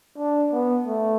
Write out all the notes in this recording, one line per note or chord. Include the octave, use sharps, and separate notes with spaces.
D4
B3
A3